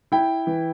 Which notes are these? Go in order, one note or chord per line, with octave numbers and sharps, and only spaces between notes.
E4 G5
E3